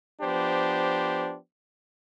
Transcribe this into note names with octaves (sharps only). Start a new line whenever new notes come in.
F3 B3 D4 G4 C5